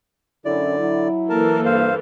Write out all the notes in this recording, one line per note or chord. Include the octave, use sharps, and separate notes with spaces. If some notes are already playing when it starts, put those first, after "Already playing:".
F#2 D3 C#4 E4 D5
F#3 E4
E3 A#3 A4 A#4 A5
G2 C5 F5